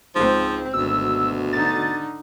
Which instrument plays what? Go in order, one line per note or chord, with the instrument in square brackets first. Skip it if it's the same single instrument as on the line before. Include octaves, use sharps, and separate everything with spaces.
[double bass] C#2 C4 [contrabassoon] G#2 [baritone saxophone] F3
[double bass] G#1 [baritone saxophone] D2 [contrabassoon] B2 [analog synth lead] E6
[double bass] D3 D#4 [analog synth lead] A6